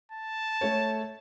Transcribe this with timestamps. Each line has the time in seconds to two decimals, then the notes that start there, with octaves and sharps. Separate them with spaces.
0.11 A5
0.61 A3 A4 C#5